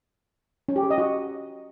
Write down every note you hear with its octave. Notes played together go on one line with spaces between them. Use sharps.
C#4
G4
G#4
D#5
F#4